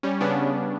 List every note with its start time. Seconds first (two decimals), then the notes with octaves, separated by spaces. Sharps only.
0.03 G3 C#4
0.21 C#3 B3 D4